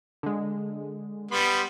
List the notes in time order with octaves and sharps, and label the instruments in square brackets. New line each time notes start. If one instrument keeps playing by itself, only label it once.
[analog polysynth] D3 G#3
[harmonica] G3 B3 B5 [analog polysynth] C6